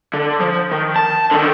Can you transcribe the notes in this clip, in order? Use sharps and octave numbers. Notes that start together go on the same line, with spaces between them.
D3
F3
D#3
A5
D3 D#3